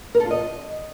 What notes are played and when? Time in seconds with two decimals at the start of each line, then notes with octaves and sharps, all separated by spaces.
0.15 A#4
0.20 A4
0.25 F4
0.31 D#5